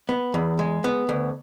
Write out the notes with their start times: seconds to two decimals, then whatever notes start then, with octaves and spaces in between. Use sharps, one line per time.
0.09 B3
0.34 E2
0.59 G#3
0.84 B3
1.09 D2